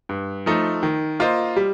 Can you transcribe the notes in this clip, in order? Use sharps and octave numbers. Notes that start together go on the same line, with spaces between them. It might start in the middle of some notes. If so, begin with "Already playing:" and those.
G2
F3 A3 D#4
D#3
A#3 F4 C5 D#5
G3